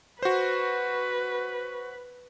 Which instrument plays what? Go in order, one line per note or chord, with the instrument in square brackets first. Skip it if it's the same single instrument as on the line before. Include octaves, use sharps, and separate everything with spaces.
[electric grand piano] F#4 C5 [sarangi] B4